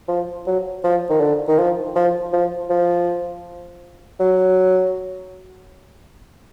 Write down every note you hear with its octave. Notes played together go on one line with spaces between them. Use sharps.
F3
F#3
F3
D#3
D3
D#3
F3
F3
F3
F3
F#3